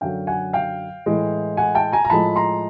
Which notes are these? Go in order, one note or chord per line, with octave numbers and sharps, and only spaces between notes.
F#2 D3 F#3 F5 G5
F#5 G#5
F5 G5
A2 E3 G#3
F#5 G#5
G5 A5
G#5 A#5
A#5
A2 F3 G#3 A5 B5
A#5 C6